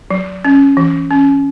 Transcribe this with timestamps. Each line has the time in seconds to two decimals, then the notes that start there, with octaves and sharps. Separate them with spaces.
0.11 F#3
0.45 C#4
0.77 E3
1.11 C#4